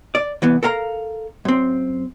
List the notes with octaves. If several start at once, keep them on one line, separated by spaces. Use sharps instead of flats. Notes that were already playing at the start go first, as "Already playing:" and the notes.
D5
C2 E3 B3
A4 A#4 F5 A#5
F#2 C4